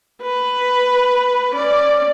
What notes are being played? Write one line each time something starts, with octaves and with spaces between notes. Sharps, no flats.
B4
C#4 D5